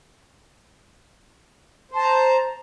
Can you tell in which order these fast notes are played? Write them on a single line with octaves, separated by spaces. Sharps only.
C5 A5 A#5